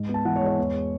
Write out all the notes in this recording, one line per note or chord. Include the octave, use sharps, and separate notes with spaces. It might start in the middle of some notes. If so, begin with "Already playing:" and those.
Already playing: G#2
B3
A5
E3 F#5
C#5
G#3
C#5
E2